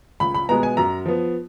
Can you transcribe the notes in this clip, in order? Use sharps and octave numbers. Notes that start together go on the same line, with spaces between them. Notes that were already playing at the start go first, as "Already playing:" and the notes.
C#2 B5
B5
B2 G#3 B3 A#5
G#5
F#2 A#5
F3 B3